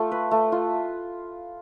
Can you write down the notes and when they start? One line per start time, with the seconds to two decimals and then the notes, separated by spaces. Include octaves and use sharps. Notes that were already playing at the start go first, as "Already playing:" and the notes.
Already playing: A3 F4
0.12 B4
0.31 A3
0.52 F4